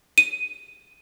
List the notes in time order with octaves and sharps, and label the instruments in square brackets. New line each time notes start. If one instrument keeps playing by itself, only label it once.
[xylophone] D#7